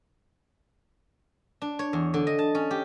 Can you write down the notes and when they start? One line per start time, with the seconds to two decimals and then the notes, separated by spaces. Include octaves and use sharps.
1.62 D4
1.79 C#5
1.93 E2
2.14 D3
2.27 D#5
2.39 A5
2.55 C#4
2.71 G4